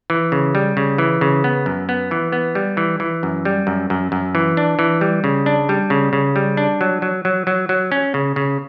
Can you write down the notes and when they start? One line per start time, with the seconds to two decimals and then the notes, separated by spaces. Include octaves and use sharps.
0.10 E3
0.32 C#3
0.55 G3
0.77 C#3
0.98 E3
1.21 C#3
1.44 B3
1.66 F#2
1.89 B3
2.11 E3
2.32 B3
2.55 G3
2.77 E3
3.00 E3
3.23 F#2
3.45 G3
3.67 F#2
3.90 F#2
4.12 F#2
4.35 E3
4.57 D4
4.79 E3
5.01 G3
5.24 C#3
5.46 D4
5.69 G3
5.90 C#3
6.13 C#3
6.36 G3
6.57 D4
6.81 F#3
7.02 F#3
7.25 F#3
7.47 F#3
7.69 F#3
7.92 C#4
8.14 C#3
8.36 C#3